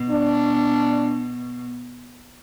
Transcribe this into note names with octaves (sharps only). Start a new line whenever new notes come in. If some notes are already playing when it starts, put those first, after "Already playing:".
Already playing: B2
D4